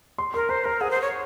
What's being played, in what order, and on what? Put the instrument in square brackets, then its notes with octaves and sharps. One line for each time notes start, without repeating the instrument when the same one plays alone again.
[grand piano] C6
[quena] A#4 [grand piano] C6
[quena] C5 [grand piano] A#5
[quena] A#4 [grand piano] A#5
[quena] G#4 [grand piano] F#5
[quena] C5
[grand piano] A#5
[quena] C#5